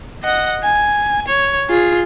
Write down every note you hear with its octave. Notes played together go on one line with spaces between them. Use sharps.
D#5 F#5
G#5
C#5
F4 G#4